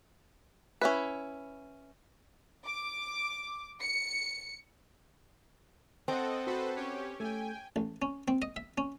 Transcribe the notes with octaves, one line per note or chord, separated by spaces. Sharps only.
C#4 E4 B4
D6
C#7
C4 A4 D#5 F#5
F#4 A4 B4 C5
C#4 G4 C#5
A3 G5 G#5
A1
C#4
C4
D#5
E5
C#4